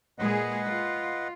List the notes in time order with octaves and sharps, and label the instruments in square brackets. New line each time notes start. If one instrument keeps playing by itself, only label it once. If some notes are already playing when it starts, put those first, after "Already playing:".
[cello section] A#2 G#3 G#4 [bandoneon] B4 D#5 F#5
[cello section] F4